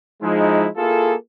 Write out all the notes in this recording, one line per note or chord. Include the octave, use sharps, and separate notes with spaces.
F3 G#3 D#4 E4
A#3 E4 F4 G#4 A4